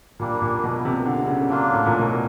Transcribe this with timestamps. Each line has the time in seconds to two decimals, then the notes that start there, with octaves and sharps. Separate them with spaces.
0.20 A#2 G3 A#3 D4
0.42 A#2
0.64 B2
0.85 C3
1.06 D3
1.27 C#3
1.49 F#3 A#3 D4 F4
1.73 A2
1.86 A#2
1.99 B2